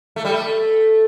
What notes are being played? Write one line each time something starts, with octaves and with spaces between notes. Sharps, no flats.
A3
G3
A3